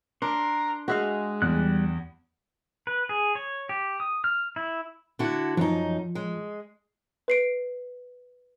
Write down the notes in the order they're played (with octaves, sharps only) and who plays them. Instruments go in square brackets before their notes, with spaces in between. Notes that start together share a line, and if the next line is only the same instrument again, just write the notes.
[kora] D4 [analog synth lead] A#4 [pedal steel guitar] C6
[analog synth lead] G#3 [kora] F#4 E5 F5
[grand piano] E2 [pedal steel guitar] G3 F#6
[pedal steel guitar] B4
G#4
C#5
G4
D#6
F6
E4
[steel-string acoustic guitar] D3 E4 F#4
[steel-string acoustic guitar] F#2 D#4 [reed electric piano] F3
[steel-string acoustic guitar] G#3
[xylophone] B4 C7 D7